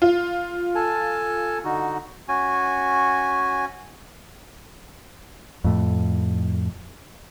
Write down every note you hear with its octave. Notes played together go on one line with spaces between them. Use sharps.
F4
A4 G#5 A5
D3 D#4 F#4
C#4 F#4 G#5
F2 A2